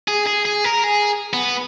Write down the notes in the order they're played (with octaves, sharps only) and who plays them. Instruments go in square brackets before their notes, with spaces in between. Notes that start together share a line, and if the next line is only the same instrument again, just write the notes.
[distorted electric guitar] G#4
G#4
G#4
A#4
G#4
B3